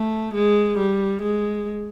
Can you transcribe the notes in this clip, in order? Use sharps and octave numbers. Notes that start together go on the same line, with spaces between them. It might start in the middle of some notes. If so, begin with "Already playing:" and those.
Already playing: A3
G#3
G3
G#3